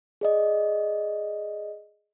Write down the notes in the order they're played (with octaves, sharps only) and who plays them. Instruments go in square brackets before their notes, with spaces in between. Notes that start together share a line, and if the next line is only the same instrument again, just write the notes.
[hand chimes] G#4 D5 D#5